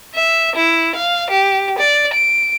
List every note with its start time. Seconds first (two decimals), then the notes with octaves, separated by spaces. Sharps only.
0.14 E5
0.56 E4
0.96 F5
1.30 G4
1.79 D5
2.13 D7